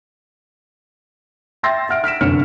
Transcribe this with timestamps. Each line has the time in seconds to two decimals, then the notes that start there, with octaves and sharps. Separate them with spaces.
1.63 E5 G5 C6 E6 A6 A#6
1.89 E5 F#5 F6 D7
2.04 F6 B6 D7 E7
2.21 F1 F#2 D3 C#5 F6 C#7